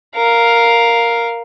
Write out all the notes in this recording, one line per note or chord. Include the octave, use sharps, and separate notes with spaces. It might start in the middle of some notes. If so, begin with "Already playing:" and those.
A#4 F5